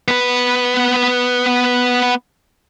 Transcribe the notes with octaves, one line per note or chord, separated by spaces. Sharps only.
B3 B4